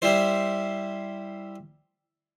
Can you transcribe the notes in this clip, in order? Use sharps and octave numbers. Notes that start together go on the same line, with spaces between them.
G3 E4 C5